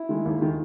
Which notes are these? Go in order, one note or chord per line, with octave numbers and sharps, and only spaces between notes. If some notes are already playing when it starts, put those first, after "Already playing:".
Already playing: E4
D#3 G#3
D#2
D#3 G#3